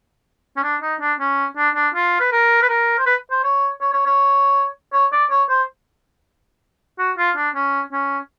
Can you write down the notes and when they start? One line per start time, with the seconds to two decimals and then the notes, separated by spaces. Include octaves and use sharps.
0.57 C#4
0.63 D4
0.82 D#4
1.00 D4
1.20 C#4
1.57 D4
1.75 D4
1.94 F4
2.20 B4
2.32 A#4
2.62 B4
2.69 A#4
2.99 C5
3.06 B4
3.31 C5
3.44 C#5
3.81 C#5
3.93 C#5
4.06 C#5
4.93 C#5
5.12 D5
5.30 C#5
5.49 C5
6.99 F#4
7.18 F4
7.36 D4
7.55 C#4
7.92 C#4